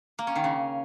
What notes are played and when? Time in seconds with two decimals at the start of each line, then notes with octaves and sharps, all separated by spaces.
0.19 A#3
0.27 C#4
0.36 D#3
0.44 C#3